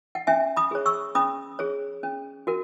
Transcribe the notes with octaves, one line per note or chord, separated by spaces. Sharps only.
F#5
C#4 E5 G#5
B5 D#6
G#4 C#5
C#6 E6
C#4 B5 D#6
G#4 C#5
C#4
F#4 A#4